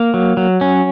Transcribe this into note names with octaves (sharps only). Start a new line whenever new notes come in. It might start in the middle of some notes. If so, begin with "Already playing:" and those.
Already playing: A#3
F#3
F#3
C#4